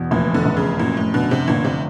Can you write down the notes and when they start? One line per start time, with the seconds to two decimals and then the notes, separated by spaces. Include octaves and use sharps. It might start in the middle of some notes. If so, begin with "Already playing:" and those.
Already playing: E2 B2
0.11 F1 A#2
0.34 D3
0.45 F1
0.57 C#3
0.79 F#2 A#2
0.97 A2
1.14 B2 D3
1.31 C3
1.48 G1 A#2
1.64 C3